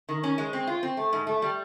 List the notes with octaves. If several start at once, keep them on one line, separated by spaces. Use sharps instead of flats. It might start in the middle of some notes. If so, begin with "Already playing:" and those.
D#3
C#4
G#3
C4
F4
C4
A3
G#2
A3
G3